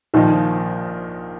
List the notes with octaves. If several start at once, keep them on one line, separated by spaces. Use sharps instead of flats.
A#1 A#2 D#3 F3 D#4